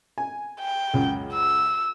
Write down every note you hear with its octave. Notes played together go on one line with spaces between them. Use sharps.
G#5
G5
C#2 F#2
E6